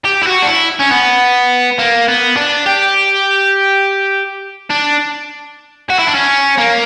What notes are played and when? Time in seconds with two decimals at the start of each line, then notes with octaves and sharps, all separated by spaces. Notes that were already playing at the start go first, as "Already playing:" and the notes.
0.05 G4
0.22 E4
0.26 F#4
0.42 D4
0.48 E4
0.80 C#4
0.92 B3
1.79 A#3
2.08 B3
2.36 D4
2.66 G4
4.70 D4
5.90 F#4
5.99 E4
6.06 D4
6.14 C#4
6.58 A#3